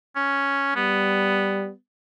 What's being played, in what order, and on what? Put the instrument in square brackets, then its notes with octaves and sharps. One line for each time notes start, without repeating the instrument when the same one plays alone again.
[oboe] C#4
[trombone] G3 [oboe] B3